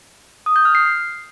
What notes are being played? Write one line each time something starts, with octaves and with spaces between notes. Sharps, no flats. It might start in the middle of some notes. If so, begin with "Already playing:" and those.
D#6
G6
F6
C7